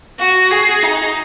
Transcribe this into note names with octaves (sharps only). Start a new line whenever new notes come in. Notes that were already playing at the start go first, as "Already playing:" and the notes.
F#4
G#4
D#4